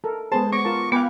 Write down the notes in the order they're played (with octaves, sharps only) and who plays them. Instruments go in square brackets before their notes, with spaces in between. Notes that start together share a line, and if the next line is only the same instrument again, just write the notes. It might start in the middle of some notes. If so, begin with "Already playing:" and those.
[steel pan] A4 A#4
[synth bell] G#3 B3 C5 [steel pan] G#4 [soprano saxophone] A5
[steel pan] B3 [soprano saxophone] C#6 [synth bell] D6 A#6 D7
[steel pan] F4 A#4 A5
[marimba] B3 [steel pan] B4 G5 [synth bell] F5 G#5 C#7 [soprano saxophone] D6